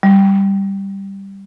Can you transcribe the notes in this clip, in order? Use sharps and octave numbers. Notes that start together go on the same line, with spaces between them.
G3